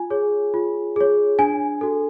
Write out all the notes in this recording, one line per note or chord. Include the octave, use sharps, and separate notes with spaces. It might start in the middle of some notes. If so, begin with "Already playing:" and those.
Already playing: F4 G#5
G#4 C#5
F4
G#4 C#5
D4 G#5
F#4 A4